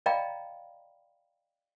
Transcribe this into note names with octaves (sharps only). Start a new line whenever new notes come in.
D5 D#5 F5 G5 A#5 B5